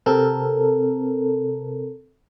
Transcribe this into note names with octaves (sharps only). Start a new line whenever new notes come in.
C3 C4 A4 A#4